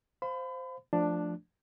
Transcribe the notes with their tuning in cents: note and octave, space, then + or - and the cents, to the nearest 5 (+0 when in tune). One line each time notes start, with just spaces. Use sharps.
C5 -5 F5 +0 B5 +35
F3 -5 A3 +0 D4 +5